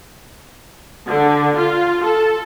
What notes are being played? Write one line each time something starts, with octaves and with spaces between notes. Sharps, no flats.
D3
F4
A4